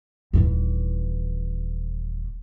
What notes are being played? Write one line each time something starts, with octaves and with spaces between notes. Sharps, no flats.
D#1 E3